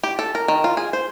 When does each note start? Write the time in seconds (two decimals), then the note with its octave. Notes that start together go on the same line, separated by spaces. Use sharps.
0.04 G4
0.19 A4
0.35 A#4
0.48 D#3
0.64 F4
0.77 G#4
0.93 C5